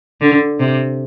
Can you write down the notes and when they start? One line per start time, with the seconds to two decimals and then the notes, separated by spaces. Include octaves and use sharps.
0.21 D3
0.60 C3